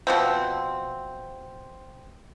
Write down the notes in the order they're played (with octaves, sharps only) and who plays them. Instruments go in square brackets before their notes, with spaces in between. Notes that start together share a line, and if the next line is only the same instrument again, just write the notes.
[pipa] B2 F3 C4